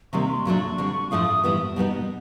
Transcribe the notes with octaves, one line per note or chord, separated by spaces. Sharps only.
C3 D#3 G3 A#3 C#6
C6
A#2 F#3 A3 D4 C#6
D3 G3 C4
A2 F3 A3 D4 F4 D#6
A2 E3 G3 B3
B2 G3 B3 D#4